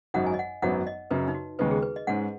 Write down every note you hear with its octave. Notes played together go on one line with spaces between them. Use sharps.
G#1 F#2 F#3 D#4 F#5
G#5
D#5
F#5
G#1 F#2 F#3 B3 F#5
D#5
F#2 C#3 F#3 B4
D#4
F#4
D#2 C#3 G#3 B3 D#4 B4
G#4
B4
D#5
G#2 G#3 C#4 F#5